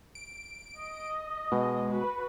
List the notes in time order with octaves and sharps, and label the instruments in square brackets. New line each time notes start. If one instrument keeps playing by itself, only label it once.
[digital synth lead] D7
[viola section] D#5
[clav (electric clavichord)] B2 [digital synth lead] G#3
[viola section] F#4 B4